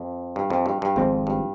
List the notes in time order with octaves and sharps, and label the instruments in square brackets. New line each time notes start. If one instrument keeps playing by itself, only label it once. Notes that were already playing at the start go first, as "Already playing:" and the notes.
Already playing: [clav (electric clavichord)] F2
G2
F2
G2
G2
[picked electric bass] G#1 G#2 F3 C4 [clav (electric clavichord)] F2
[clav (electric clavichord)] G2